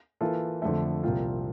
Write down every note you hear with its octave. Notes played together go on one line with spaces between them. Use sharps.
E3 A#3 F4 A4
F2 D3 F3 A3
C2 A#2 F3 C4 F4